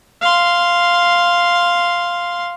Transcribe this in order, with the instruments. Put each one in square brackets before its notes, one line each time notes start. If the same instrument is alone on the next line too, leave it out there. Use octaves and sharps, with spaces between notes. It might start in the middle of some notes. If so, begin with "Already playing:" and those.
[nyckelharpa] F5 C6